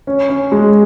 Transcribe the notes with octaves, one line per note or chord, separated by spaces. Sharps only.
C#4
C#4
G#3